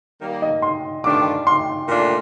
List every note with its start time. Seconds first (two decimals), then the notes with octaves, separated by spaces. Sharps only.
0.21 D#3 G3 A#3
0.42 D#5
0.62 C6
1.04 G2 D#3 A3 D4 F4 D6
1.47 C6
1.89 A#2 A3 D4 F4